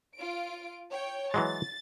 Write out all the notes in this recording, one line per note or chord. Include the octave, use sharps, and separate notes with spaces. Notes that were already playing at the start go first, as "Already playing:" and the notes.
F4 D7
C#5 G5
E3 F#3 G#3 A6